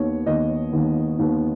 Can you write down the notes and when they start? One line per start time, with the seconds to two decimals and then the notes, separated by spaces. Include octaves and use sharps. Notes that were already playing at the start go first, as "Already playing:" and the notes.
Already playing: D#2 D#3 B3 C#5
0.26 D#2 D#3 B3 D#5
0.73 D#2 D#3 B3
1.18 D#2 D#3 B3